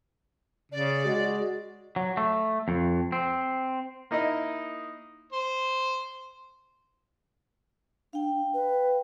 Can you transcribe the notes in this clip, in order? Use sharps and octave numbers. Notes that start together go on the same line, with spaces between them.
C#3 D5
G#3 F#4
F#3
A3
F2
C4
A#3 D#4 E4 D#5
C5
D4 F5 G5
B4